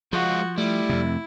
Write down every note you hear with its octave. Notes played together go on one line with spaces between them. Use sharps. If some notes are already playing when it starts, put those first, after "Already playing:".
F3 G#3 F4 F#4
G3 A3 E4
F2 C3